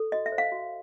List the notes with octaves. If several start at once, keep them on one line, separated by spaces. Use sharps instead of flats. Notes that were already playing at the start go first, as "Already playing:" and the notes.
Already playing: A4
F#4 D#5
E5
C5
F5
F#4